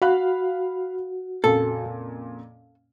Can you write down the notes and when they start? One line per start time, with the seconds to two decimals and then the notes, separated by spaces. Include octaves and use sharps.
0.02 F#4 F5 B5 F#6
1.44 F2 A#2 C#3 A4